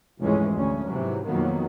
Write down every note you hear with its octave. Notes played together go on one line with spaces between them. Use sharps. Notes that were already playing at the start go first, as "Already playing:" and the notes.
F1 C#2 G#2 E3 G#3 C#4
D2 C#4
G#2 C3 E3 F#3
F2 B2 D#3 F#3 A#3 B3